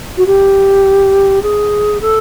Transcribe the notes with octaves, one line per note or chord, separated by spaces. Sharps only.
F#4
G4
G#4
A4